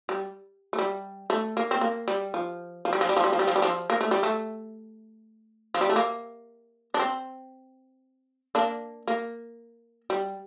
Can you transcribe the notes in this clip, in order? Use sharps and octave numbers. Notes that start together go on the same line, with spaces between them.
G3
A3
G3
A3
A#3
C4
A#3
G3
F3
F3
G3
F3
G3
F3
G3
F3
G3
F3
G3
F3
A#3
A3
G3
A3
F3
G3
A3
A#3
D4
C4
A#3 D4
A#3
G3